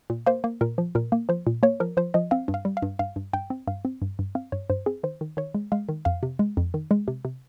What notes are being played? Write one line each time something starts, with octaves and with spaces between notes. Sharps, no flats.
A#2
A#3 C5
A#3
A#2 A#4
F3
A#2 A#4
A#3
F3 C5
A#2
A#3 C#5
F3 A#4
F3 C5
F3 D#5
C4 F5
G2
F5
G3
F5
G2
G2 F5
G2
G2 G5
C4
G2 F5
C4
G2
G2
C4 F5
G2 C#5
G2 C5
C4 G#4
D#3 C5
D#3
D#3 C#5
G#3
G#3 F5
D#3
F2 F5
C3
G#3
F2
D#3
G#3
C3
C3